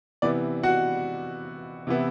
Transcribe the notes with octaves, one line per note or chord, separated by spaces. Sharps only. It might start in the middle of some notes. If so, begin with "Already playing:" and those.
C3 E3 B3 D5
F#4 F#5
C3 E3 B3 E4